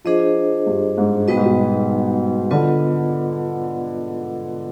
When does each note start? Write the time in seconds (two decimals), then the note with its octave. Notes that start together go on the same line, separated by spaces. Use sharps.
0.04 F3 D4 G#4 C5 D#5
0.67 G2
0.98 G#2
1.27 B2 G3 B3 D#4 B4 D#5
1.37 G#2
1.45 B2
2.51 D3 B3 F4 B4 D#5